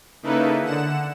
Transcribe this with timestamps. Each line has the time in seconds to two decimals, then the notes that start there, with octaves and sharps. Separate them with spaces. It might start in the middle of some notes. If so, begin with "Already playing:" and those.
0.23 C#3 A#3 D#4 E4 A4 B4
0.63 D3 F#5 E7